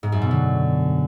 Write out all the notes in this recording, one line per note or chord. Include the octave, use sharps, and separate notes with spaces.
G#2
F#2
B2
D3